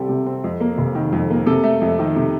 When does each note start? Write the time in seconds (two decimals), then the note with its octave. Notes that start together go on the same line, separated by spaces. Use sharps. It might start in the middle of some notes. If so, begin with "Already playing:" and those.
Already playing: C2 G3 C4 G4 A4
0.09 C3
0.26 C4
0.44 F2
0.60 A#3
0.78 F1
0.95 D#3
1.12 F2
1.30 A#3
1.46 C3 A4
1.64 A3
1.81 F2
1.99 D#3
2.16 C3